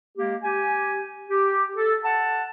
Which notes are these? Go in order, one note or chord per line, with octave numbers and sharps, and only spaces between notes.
G#3 A#3 G4
G4 G#5
G4
A4
F#5 A5